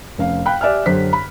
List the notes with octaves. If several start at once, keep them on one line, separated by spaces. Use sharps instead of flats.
F1 C#4 F5
F5 G5 B5 F#6
G4 D5 E5 G#5 F6
F#2 D3 G4 C5 B6
B5